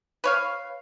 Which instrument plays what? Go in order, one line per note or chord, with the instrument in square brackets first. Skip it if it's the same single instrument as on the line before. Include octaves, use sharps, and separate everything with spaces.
[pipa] B4 C#5 F5